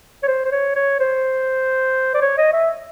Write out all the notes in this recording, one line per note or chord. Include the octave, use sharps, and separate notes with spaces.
C#5
C5
C5
C#5
C#5
C5
D5
C#5
D#5
E5